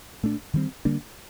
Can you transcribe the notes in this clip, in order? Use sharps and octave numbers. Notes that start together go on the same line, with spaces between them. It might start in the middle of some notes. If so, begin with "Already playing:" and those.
A#2 A3 D4
D#3 G3 C4
D3 G3 A#3 D4